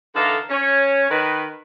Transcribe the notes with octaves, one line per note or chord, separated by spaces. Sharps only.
D3 E3 D#4 A4 A#4 F5
C#4 C#5
D#3 B4